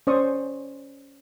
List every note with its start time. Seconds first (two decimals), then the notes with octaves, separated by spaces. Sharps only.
0.07 C#4 C5 D5 C#6 D#6